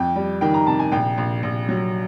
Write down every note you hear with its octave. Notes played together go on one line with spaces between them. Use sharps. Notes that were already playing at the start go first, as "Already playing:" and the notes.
Already playing: F2 G5
G3
D#3 G5
A#5
C3 A5
G#5
A#1 G5
A#1
A#1
F#3